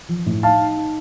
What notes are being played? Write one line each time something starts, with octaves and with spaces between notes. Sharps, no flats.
F3
A2
D#4 F5 A5
D#4
D#4